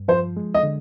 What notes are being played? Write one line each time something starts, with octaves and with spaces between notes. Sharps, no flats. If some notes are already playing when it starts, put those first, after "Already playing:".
Already playing: G2
F3 C5
G#3
D#5
D3